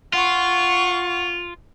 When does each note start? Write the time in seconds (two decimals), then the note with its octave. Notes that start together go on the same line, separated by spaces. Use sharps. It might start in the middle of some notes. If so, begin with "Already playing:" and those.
0.13 F4 F#5 C#6